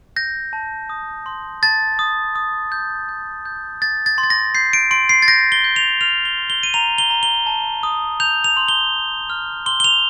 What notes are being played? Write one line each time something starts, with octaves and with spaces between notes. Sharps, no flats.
G6 A#6
A5
D#6
C6
A5 A6
D#6
D#6
G6
G6
G6
G6 A6
A6
C6
A6
A#6
G6 C7
D7
C6 D7
C7
A6
G6 A#6
G7
G6
F7
F6 F7
G7
C6
G7
D#7
A#5 F7
G7
A#5
G7
A5
D#6
G6 F7
F7
C6
G7
C6
F6
C6 G7
G7
F7